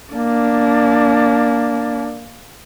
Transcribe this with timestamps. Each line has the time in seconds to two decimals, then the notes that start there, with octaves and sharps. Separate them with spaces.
0.13 A#3 D4